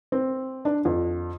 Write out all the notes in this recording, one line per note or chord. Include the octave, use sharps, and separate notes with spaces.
C4
D4
F2